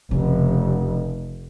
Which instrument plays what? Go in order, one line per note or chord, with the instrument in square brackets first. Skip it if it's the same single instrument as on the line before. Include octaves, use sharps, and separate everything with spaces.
[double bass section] F1 [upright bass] C#3